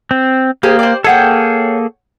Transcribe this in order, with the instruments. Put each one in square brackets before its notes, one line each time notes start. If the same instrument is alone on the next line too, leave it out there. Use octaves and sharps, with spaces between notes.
[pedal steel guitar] C4
[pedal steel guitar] A#3 [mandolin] G4 G#4 C5
[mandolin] C5 D5
[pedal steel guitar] A#3 G#4 A4 [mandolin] C#5 F#5 G5